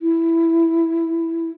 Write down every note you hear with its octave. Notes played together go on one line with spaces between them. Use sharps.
E4